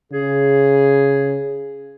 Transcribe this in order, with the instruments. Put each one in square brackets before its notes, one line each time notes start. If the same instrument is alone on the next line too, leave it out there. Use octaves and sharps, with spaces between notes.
[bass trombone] C#3 [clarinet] G#4